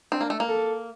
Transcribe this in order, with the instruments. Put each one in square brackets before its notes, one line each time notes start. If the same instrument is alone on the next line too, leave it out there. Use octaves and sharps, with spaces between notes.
[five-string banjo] C4 [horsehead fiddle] D4
[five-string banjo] A#3
A3
A#3
[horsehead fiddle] A4